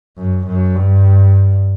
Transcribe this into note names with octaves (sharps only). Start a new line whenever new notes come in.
F#2
F#2
G2